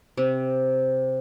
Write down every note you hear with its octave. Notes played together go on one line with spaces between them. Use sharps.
C3